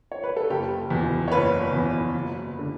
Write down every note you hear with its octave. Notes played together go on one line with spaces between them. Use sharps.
C#5
B4
A4
F#1 G4
E2 B2
C#5
F#1 B4
E2 B2
F#1
D3